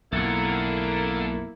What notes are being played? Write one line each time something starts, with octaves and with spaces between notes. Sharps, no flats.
B1 F2 A#3 E4 A4 F#5